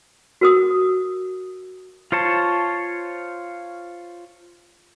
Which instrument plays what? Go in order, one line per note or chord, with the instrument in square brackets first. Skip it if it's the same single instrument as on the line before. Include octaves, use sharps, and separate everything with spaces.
[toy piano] F#4 A#4 D#6
[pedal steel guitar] F4 C5 C#5 A5